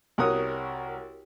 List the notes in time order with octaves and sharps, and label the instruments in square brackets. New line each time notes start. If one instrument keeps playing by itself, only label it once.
[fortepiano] C2 F#4 A#4 C#5 F#5 D#6